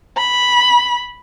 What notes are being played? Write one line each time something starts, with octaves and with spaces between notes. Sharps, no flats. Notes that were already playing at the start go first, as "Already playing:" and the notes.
B5